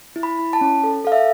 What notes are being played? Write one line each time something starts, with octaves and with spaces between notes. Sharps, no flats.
E4
B5
E4
A5
C#4
A4
A4 F5
E5